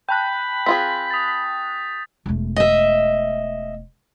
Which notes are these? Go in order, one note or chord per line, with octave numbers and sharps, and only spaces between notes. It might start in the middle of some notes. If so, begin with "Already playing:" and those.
G5 A5 B5 F#6 G6
C4 F4 G#4 B6
D#6 A6
E1 A3
D#5 E5